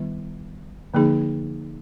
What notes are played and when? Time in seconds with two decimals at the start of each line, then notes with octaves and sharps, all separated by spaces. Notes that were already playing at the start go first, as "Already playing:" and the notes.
Already playing: D#3 G3 B3 E4
0.94 D3 F3 A#3 D#4 G#4